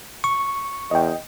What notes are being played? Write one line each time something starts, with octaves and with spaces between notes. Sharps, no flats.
C#6
E2 D#5 G5